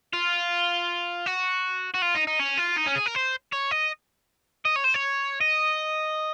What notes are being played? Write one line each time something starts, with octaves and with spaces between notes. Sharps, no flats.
F4
F#4
F#4
F4
D#4
D#4
C#4
F4
D#4
C#4
G#4
A#4
C5
C#5
D#5
D#5
C#5
C5
C#5
D#5